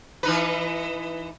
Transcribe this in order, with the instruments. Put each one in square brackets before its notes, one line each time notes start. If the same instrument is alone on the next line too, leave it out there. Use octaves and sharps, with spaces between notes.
[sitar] E3 D#4 B4